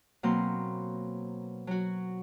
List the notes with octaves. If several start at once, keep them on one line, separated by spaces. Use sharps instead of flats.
B2 F#3 A#3 C4 C6
F#3 F#4